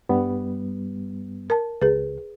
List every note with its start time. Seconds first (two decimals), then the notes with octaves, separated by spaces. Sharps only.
0.09 G2 G3 B3
1.50 A#4 A5
1.82 C#2 G#4 B4